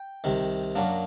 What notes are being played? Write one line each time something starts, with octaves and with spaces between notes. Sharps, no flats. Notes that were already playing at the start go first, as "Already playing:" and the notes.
Already playing: G5
C2 C3 D#3
F#2 F#3 A#3 D4